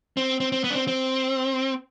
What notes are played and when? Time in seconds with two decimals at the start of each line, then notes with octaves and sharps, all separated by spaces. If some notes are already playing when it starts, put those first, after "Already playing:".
0.17 C4
0.40 C4
0.52 C4
0.64 B3
0.71 D4
0.75 C4
0.88 C4